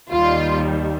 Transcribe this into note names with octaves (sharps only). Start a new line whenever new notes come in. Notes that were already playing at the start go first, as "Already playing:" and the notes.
D#2 D#3 G3 F4